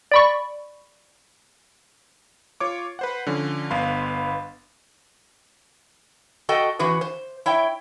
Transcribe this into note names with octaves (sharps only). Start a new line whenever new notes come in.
D5 B5 C#6
F4 C#5 D6
B4 C5 F#5
D3 F3 C#4
G1 B3 B4 F5 B5 C6
F#4 A4 D#5 G5
E3 C#4 F#4 B4
C5
E4 C#5 E5 G5